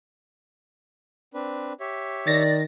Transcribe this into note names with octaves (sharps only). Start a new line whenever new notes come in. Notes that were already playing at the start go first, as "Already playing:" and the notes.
C4 D4 B4
G4 C#5 E5
D#3 D5 A6 A#6